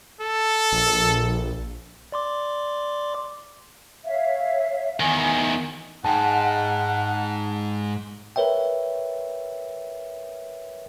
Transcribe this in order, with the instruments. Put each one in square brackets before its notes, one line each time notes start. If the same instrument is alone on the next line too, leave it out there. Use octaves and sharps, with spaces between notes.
[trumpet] A4
[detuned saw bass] A#1
[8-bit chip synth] D5 C6 D6
[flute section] C#5 E5 F5
[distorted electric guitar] E2 D#3 [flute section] G#5
[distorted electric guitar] G#2 [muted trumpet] F#5 [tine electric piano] G5 A5
[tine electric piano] A#4 B4 C#5 E5 G5